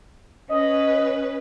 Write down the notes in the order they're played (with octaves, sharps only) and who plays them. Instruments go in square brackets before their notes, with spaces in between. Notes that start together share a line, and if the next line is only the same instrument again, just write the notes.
[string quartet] C#4 B4 [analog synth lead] D#5